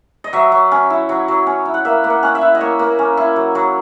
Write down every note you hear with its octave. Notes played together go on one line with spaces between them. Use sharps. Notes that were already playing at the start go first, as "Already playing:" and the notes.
D#5
F#3 E5
F#3
C#4
E4
F#3
F#3
C#4
E4
F#5
A#3 E5
A#3
F#5
C#4 F#5
E5
E4
D#5
A#3 C#5
A#3
C#4
E4
F#3
F#3